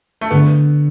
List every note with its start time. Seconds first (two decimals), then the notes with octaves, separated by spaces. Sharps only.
0.21 A3
0.31 D3 B3